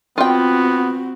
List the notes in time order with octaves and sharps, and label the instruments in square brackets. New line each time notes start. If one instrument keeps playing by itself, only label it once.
[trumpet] B3 [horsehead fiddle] C4 F#4 [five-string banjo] F4 G5